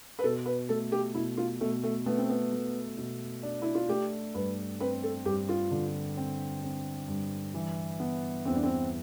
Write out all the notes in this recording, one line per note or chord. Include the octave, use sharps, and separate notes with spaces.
B4
B2 A4
B4
A3 A4
G4
B2 E4
F4
B2 A3
A3
A3 B3
C4
B3
A3
B2
D4
E4
F4
A3 G4
G2 B4
C4 B4
A4
G2 G4
F4
D3
C4
C4
G2
E3
B3
E2 C4
D4
C4